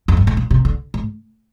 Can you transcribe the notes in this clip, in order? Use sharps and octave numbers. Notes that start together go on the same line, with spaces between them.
F2
G2
A2
A#2
C3
D3
A2